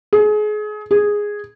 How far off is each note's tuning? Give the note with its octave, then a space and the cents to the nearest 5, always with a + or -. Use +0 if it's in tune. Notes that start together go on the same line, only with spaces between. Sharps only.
G#4 +30
G#4 -5